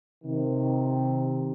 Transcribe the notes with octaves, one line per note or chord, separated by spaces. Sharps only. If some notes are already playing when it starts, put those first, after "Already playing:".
C3 D#3